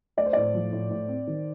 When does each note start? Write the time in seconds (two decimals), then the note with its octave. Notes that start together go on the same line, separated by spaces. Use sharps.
0.17 A3 D5
0.26 C5
0.33 A2 D5
0.54 F3
0.73 A2
0.90 A2
1.08 C4
1.27 D#3